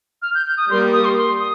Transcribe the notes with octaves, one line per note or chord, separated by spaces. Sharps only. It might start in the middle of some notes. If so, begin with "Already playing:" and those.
F6
G6
G6
D#6
G3 A#3 G4 A#4 C6
D#6
C6
C6
D#6